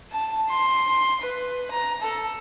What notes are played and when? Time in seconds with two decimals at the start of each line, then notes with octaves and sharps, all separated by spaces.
0.12 A5
0.48 C6
1.22 B4
1.71 A#5
2.02 A4